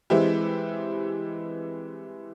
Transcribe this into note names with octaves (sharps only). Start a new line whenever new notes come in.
E3 G#3 C4 E4 G4